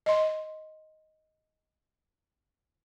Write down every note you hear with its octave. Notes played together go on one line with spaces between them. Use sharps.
D#5 C6